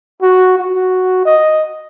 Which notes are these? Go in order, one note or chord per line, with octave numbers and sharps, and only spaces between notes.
F#4
F#4
D#5